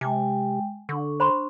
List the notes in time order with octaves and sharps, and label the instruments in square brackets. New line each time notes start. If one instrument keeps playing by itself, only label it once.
[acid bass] C3 [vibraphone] G#3 G5 G#5
[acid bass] D3 [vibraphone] D4 C#6
[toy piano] C5 B5 C6